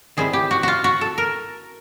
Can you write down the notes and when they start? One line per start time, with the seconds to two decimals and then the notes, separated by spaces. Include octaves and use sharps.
0.17 D#3 G3 C4 E4 G#4
0.33 G4
0.51 F#4
0.63 F4 F#4
0.84 F#4
1.01 A4
1.18 A#4